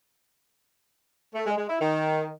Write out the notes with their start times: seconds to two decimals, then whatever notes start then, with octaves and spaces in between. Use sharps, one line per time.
1.35 A3
1.46 G#3
1.58 G#3
1.69 E4
1.81 D#3